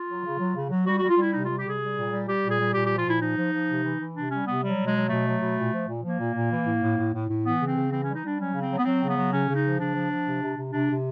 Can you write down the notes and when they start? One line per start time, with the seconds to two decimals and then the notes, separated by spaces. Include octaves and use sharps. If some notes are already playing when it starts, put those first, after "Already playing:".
Already playing: F4
0.09 F#3
0.24 C#3
0.39 F#3
0.56 C#3
0.70 F#3
0.86 G3 F#4
0.98 G3 F#4
1.10 F4
1.18 G3 E4
1.33 C3 D#4
1.45 G3 F4
1.57 G4
1.65 C3 G#4
1.80 G3
1.96 A#2
2.11 G3
2.27 G3 G4
2.43 A#2
2.51 G#4
2.59 G3
2.74 A#2 G4
2.86 F3 G4
2.98 F4
3.06 A#2 E4
3.21 F3 D#4
3.37 F3
3.52 F3
3.68 C3
3.84 E3
4.00 E3
4.16 C3 D4
4.31 G3 C#4
4.46 C3 B3
4.62 F#3 G3
4.78 B2
4.87 G#3
4.93 F#3
5.09 B2 A3
5.26 F#3
5.41 B2
5.57 A#2
5.73 F3
5.88 A#2
6.03 F3 A#3
6.19 A#2
6.35 A#2
6.50 E3
6.66 A2
6.82 A2
6.97 A2
7.13 A2
7.29 A2
7.45 E3 B3
7.60 C#3
7.67 C4
7.76 C#3
7.91 E3 C4
8.04 G3 C#4
8.15 D#4
8.23 G3 D4
8.38 F#3 C#4
8.54 C#3
8.62 C4
8.70 F#3
8.77 B3
8.85 F#3 C4
9.01 C#3
9.08 B3
9.17 F#3
9.32 C#3 C#4
9.48 C#3
9.56 D#4
9.64 F3
9.80 C#3 D4
9.95 F3
10.11 F3
10.26 C3
10.42 C3
10.57 C3
10.73 C3 D4
10.89 C3